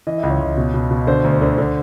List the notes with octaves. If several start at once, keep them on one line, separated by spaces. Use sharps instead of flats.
E3 D#5
C#2 E5
C#5 D#5
C#2
B2
B2
B2
D3 C5
D2
D3
D3